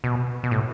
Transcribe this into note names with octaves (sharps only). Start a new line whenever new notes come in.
B2
B2
A2